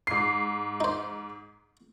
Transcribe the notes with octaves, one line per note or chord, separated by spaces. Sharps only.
G#2 C7
D#4 C5